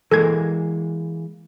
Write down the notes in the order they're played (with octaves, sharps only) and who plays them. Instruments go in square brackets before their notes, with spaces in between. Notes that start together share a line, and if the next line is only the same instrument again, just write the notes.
[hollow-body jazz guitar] E3 G#3 A#3 [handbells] A4 G#6